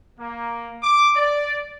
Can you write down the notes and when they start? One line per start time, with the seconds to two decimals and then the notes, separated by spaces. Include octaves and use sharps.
0.20 A#3
0.83 D6
1.16 D5